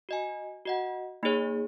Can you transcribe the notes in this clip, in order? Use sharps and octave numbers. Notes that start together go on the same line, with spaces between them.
F#4 D#5 G#5
F#4 D#5 F#5
A#3 D#4 G#4 C#5